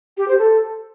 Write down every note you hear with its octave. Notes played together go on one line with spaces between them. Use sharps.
G4
C5
A4